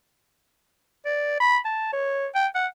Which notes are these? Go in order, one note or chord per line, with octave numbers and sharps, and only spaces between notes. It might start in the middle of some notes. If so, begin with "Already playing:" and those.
D5
B5
A5
C#5
G5
F#5